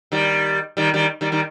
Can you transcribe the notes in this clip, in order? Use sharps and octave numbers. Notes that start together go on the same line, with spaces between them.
D#3 G3
D#3 G3
D#3 G3
D#3 G3
D#3 G3